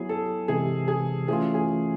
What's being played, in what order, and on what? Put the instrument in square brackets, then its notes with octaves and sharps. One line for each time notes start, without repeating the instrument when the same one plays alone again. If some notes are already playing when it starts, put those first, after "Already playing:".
Already playing: [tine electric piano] F#3 B3 E4 [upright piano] G#4
[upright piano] A4
[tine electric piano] C3 E3 G#3 [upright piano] G#4
[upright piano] G#4
[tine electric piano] E3 A3 C#4 F4 [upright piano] G#4
[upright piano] G#4